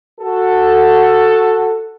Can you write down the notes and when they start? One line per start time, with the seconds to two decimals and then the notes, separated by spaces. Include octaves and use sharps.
0.21 F#4 A4